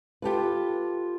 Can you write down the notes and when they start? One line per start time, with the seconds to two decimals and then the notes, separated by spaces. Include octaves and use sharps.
0.22 F4 G4 A4 B4